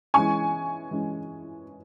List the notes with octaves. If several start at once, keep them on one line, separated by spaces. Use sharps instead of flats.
E3 G#3 C#4 G#5 C#6
E3 G#3 C#4